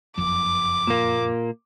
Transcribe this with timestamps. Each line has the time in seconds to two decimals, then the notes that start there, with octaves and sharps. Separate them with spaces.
0.18 F#1 F2 D6
0.87 A#2 A#3